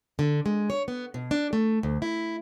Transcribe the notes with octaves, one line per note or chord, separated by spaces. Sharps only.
D3
G#3
C#5
B3
B2
D4
A3
D2
E4